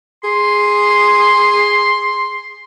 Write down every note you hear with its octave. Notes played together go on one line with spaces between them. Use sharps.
G#4 C6